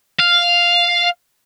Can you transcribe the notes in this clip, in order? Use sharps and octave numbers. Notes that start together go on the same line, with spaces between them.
F5